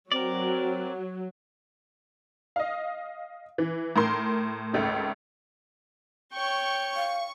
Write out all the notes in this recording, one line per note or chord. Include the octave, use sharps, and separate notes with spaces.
F#3 C4 A#4 D5
D#5 F5
E3
A2 A#4 C6
G#1 C#2 A3
C#5 G5 C#6
F5